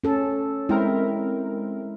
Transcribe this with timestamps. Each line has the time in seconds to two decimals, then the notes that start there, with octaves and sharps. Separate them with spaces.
0.04 C#4 A4
0.69 G#3 C4 E4 A#4